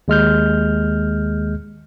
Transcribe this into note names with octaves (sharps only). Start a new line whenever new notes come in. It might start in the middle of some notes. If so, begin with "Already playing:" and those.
D#2 G#3 F6 G6